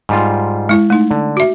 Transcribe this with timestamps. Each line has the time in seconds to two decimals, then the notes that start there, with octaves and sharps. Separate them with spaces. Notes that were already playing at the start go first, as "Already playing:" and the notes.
0.09 G#2 G3 F4
0.69 G#3 E4
0.90 A3 D#4
1.11 D3
1.37 F#4 E5